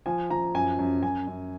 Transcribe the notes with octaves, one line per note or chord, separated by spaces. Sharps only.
F3 G#5
F3 A#5
F#2 G#5
F#2
F#2 G#5
F#2